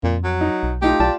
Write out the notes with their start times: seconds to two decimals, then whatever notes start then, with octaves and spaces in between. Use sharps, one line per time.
0.04 F2 A#2
0.24 F#3
0.41 D#4
0.63 B1
0.82 A3 D#4 F4 G4
1.00 B1 F4 D5 A5